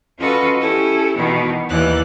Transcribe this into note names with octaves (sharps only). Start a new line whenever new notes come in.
C#4 F4 F#4 A4 B4 D#5
C#4 E4 G4 A4
B2 D#3 E3 B3
D#2 E3 D5 F#6